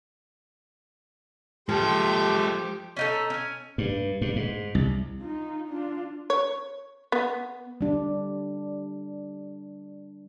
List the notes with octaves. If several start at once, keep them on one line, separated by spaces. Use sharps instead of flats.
F3 G#3 G4 A4 G5 C6
C#4 D#4 A4
C#4 G#5
G2
G2
G#2
C2
D#4 F4
D4 F4
C#5
B3
G3 D4